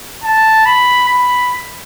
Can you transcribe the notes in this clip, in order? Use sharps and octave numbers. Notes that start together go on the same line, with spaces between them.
A5
B5
B5